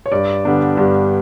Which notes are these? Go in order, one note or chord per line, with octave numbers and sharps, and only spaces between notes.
C#5
G2 D5
D3 G3 B3 D4
G2